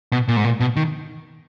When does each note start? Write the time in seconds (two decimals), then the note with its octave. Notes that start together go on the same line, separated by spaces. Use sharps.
0.12 B2
0.28 A#2
0.37 G#2
0.44 A#2
0.60 B2
0.76 D#3